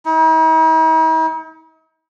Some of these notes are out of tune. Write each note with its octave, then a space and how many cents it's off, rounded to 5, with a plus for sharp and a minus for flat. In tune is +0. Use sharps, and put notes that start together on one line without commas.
D#4 +45